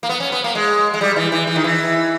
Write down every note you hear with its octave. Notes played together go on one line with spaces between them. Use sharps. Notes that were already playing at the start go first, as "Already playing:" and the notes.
A#3
B3
C#4
B3
A#3
G#3
G#3
G3
E3
E3
E3
D#3
E3